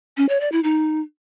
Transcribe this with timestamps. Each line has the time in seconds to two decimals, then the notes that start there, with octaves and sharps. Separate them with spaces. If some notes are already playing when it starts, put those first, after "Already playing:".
0.17 C#4
0.29 C#5
0.40 D5
0.52 E4
0.64 D#4